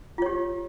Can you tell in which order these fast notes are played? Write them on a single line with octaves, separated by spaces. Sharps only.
F4 C#5 G4